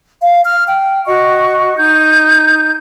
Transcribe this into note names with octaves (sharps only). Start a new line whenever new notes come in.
F5
F6
G5
F#4 D#5 C#6
D#4 G6